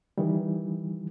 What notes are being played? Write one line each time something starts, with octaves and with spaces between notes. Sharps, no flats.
D#3 E3 G3